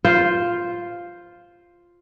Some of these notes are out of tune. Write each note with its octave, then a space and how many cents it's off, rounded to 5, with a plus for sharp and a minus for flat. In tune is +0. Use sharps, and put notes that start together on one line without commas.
F4 +0 C5 +0